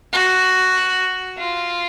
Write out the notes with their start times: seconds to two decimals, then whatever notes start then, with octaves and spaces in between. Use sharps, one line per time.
0.13 F#4
1.38 F4